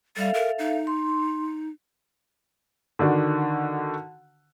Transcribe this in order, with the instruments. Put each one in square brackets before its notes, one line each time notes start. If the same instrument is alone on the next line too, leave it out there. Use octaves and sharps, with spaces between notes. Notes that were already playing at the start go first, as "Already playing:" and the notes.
[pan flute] G3 [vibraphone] A4 E5 F5
[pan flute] A#4
D#4
[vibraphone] C6
[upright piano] D3 D#3 D4 F#4